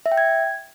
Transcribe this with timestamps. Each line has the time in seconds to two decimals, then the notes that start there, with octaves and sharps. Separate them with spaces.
0.06 E5
0.12 G5
0.17 G#6